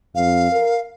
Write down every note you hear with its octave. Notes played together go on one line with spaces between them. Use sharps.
F2 F5
A#4